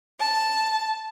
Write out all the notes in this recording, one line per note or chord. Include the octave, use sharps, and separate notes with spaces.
A5